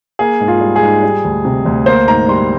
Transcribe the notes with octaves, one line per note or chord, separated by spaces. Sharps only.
A#3 G#4
G#2
F4
G3
G#4
G#2
G3
D2
C3
D2
A#3 C5
G#2 A#5
G3 C6